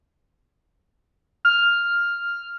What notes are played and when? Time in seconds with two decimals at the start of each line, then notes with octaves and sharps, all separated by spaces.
1.45 F6